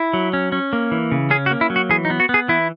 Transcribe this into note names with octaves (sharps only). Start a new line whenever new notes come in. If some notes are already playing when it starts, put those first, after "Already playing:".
Already playing: E4
F#3
C#4
C#4
A#3
E3
C#3
C#4 G#4
F#4
A#3
E4
F#3
F#4
E3 G#4
D#4
B3
F#4
B3
G#4
E3 E4